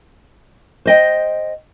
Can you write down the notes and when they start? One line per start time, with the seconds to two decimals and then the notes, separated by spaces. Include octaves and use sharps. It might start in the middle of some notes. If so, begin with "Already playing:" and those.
0.86 C5 D#5 G5